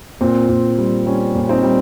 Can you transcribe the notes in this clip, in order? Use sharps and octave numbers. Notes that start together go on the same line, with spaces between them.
A#2 C4
A#2
G3
G3 C#4
A#2
C4 D#4
G3